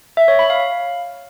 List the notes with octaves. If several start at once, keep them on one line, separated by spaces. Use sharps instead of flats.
E5
C#5
B5
F5